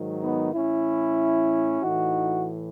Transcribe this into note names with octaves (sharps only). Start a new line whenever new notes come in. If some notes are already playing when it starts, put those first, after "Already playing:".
Already playing: G#2 D#3 F#3
B3 D#4
A2 E3 C#4 E4
A2 E3 D#4 F#4